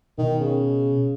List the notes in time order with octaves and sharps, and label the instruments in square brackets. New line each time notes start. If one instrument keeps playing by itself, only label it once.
[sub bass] B2 [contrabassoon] D#3
[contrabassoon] C#3